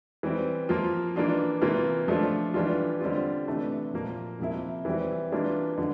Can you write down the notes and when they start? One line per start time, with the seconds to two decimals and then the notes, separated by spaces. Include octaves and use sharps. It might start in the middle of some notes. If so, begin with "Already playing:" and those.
0.23 E3 G3 C4
0.69 F3 A#3 F4
1.16 E3 A#3 D4 F4
1.61 C3 E3 A#3 F4
2.08 F3 A3 D4 F4
2.54 E3 G3 D4 F4
3.01 D3 G3 C4 F4
3.48 C3 E3 A3 D4
3.94 A#2 F3 A#3
4.39 C3 F3 A#3 E4
4.85 E3 G3 C4 E4
5.32 E3 G3 A#3 D4 F4
5.78 D3 F3